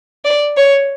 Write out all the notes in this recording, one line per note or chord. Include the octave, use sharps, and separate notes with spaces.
D5
C#5